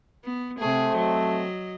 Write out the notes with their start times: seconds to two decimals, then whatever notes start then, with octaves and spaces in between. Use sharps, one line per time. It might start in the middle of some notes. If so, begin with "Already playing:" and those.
0.24 B3
0.59 C3 A3 C4 G#4
0.95 F#3 D#5